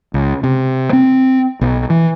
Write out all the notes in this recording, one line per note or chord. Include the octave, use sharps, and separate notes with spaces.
C#2
C3
C4
B1
E3